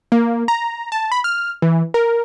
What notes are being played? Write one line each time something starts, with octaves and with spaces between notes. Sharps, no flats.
A#3
A#5
A5
B5
F6
E3
A#4